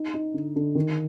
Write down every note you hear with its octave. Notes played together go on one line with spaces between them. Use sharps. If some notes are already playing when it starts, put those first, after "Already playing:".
Already playing: D#4
D#4
D3
D3
D#3